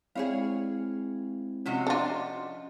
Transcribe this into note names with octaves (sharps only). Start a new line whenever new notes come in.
G#3 C4 E4 G#4 C#5 F5
C3 F3 C#4 F#4 D#5
D4 F4